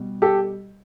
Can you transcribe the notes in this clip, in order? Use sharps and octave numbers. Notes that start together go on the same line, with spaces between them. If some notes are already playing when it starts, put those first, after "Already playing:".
Already playing: B2 G3
G4 A4